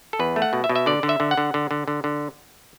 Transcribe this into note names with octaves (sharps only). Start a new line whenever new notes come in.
A4
E2 B4
A3
F#5
B2
E5
B2
E5
D3 D5
D3
E5
D3
F#5
D3
D3
D3
D3
D3